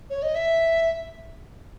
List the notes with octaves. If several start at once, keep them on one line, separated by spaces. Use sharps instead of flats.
C#5
D#5
E5